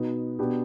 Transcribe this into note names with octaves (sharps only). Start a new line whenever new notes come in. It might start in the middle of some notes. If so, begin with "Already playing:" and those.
Already playing: B2 B3 D#4
B2 B3 D4 G4